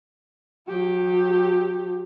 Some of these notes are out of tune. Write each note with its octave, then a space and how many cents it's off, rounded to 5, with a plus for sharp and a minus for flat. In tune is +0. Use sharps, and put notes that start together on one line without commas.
F#3 -35 G4 +0